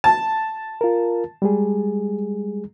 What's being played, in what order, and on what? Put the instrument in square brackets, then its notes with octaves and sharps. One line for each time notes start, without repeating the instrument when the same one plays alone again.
[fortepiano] A5
[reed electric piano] F4 A#4
G3 G#3 G#4